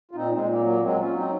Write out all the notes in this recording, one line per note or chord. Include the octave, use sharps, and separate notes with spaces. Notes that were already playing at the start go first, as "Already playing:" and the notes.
F4
A#2 C4 D#4
G#3 C4
A#2
C4
A#3
F#3
A#3
F#3 G#3 C4
C#4 F4
F#3
C4 D#4